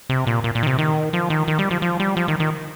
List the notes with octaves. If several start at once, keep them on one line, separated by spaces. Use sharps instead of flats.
C3
A#2
A#2
A#2
D#3
C3
D#3
F3
D#3
D#3
G3
F3
F3
G3
F3
D#3
D#3